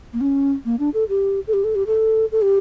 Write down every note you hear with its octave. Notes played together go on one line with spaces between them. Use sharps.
A#3
C#4
A#3
D4
A4
G4
A4
G4
A4
G4
A4
A4
G4